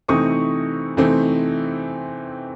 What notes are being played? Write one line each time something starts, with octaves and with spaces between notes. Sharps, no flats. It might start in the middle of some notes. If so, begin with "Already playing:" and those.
C3 E3 A3 C4 D#4 C#6 D#6
C3 E3 A3 C4 D#4